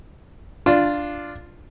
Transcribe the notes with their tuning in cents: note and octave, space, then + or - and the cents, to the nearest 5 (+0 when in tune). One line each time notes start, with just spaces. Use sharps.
D4 +0 F4 -5